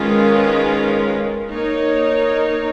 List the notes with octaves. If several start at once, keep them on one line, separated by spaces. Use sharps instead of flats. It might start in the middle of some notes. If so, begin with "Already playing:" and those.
Already playing: D#3 G#3 C#4 F4 B4
A#3 D#4 A#4 C#5